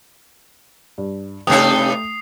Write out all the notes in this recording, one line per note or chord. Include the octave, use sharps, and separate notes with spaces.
G2
G2 C3 A3 D#4 G5 D#6 C7